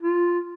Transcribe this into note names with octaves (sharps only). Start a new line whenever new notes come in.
F4